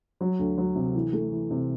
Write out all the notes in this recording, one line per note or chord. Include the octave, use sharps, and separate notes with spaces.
F#3
D2
F#3
C3
E3
A3
E3
C3